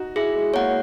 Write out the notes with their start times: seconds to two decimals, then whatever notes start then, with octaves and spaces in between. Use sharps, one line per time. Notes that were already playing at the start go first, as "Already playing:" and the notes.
Already playing: D#4 F#4
0.16 E4 G#4
0.35 G#3
0.54 A#3 C#5 F#5